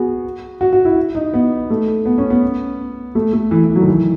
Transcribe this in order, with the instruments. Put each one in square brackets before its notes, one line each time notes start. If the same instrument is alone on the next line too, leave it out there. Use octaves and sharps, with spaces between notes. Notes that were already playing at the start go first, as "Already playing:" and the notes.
Already playing: [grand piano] B3 F#4 G#4
F#4
F#4
E4
D#4
B3
A3
B3
C#4
B3
A3
A3
E3
E3
F#3
D#3
E3